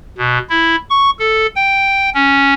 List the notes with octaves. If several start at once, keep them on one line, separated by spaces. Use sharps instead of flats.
B2
E4
C#6
A4
G5
C#4